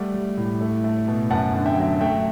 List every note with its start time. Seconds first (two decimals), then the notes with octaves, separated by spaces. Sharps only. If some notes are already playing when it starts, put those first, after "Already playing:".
Already playing: G3 A3 D5 F#5
0.14 G3
0.37 A2
0.61 A3
0.84 A3
1.08 B2
1.30 F#2 F#5 A5
1.55 D3
1.66 E5 G5
1.78 F#3
2.01 A3 E5 G5